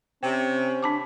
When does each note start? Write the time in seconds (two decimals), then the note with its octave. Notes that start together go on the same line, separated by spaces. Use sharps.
0.23 C3 C4 C#4 G5
0.83 D4 A5 D6